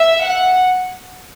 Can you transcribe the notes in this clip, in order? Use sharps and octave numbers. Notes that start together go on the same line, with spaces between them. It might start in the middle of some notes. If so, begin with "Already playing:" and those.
Already playing: E5
F#5